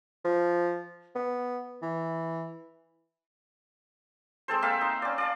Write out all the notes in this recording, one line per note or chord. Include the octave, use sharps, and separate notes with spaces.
F3
B3
E3
G#3 C4 A4 C5
A#3 C4 E5 F5
D#4
C#4 D5
D5 F5 A5